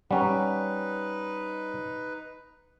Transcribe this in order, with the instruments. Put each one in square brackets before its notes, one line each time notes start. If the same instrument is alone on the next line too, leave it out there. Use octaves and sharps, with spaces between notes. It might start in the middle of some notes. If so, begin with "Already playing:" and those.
[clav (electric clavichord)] G3 C#4 [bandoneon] D#4 B4 [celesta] F#5 G5 A#5